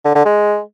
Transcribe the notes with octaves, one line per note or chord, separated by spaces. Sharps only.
D3
D3
G#3